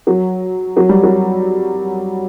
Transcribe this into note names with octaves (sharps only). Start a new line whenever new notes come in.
F#3
F#3
G3
F#3